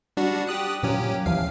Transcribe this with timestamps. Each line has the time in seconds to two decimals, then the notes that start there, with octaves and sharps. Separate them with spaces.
0.17 G3 D4 F#4
0.47 G4 D#6 F#6
0.83 A#2 F#3 C#4 G4
1.26 D#2 E3 F3 F5